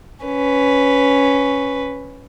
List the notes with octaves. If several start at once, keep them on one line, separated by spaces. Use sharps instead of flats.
C#4 B4